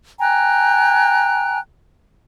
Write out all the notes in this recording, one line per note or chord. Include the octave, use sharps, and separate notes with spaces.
G5 G#5 A#5 F#6